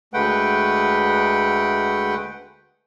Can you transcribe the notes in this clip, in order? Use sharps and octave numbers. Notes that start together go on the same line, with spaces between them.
D2 G#3 A3 B4 F#5 G5